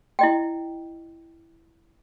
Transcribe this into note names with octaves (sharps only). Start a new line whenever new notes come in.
E4 D#5 G5